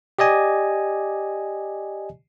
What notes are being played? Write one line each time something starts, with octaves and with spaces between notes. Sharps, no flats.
G4 D5 D#5 G#5